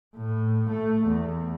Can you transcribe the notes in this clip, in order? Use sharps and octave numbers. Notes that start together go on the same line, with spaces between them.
A2
A3
E2